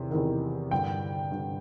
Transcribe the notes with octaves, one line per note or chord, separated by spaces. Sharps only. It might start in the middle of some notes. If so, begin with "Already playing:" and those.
Already playing: E2 C3 D#3
E2 C3 D#3
G2 D3 G5
G2 D3